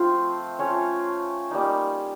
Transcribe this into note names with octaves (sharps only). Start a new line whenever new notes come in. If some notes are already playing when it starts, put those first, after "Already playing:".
Already playing: F3 A3 C4 F4 C5
A3 C#4 F4 C#5
G3 A#3 D#4